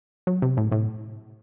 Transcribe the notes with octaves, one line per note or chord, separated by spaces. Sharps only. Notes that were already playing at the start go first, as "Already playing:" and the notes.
F#3
C3
A2
A2